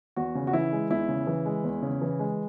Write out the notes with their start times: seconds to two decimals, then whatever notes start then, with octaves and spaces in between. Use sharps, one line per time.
0.16 E2 F#4
0.35 C#3
0.47 F#4
0.53 E3 E4
0.72 G#3
0.90 E2 E4
1.08 C#3
1.27 E3
1.46 G#3
1.64 E2
1.82 C#3
2.02 E3
2.19 G#3